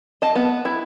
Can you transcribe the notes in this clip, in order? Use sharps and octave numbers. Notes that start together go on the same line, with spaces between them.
D#5 A5
B3
E4